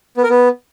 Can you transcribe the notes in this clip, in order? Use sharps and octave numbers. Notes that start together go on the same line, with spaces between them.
B3
A#4
B3